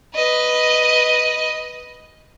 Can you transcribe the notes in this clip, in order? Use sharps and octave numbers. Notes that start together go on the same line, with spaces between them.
B4 D#5